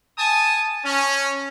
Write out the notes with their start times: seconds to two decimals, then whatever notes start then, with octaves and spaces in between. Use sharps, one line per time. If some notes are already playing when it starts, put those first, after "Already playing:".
0.18 G#5 A5 D#6
0.85 C#4